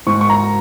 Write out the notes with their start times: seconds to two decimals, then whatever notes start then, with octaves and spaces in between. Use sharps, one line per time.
0.07 G#2 C#6
0.21 C#6
0.30 A#5